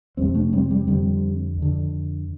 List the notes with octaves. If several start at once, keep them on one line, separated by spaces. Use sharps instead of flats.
F2 C3 G3 C4
A3 D4
G3 C4
G3 C4
F2 D3 G3 C4
F2 D3